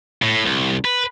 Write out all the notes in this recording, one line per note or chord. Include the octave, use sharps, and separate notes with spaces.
A2
C2
B4